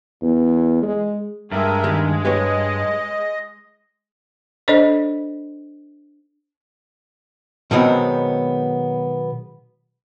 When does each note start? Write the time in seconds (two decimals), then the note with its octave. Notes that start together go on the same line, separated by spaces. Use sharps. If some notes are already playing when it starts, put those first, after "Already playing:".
0.22 E2
0.82 G#3
1.52 G2 G#3 A#4 E5
1.84 D#3 D4 G4
2.25 G4 B4 C#5 D#5
4.68 D4 A4 C5 D5 D#5
7.71 B2 D#3 F#3 G#3 B3 C4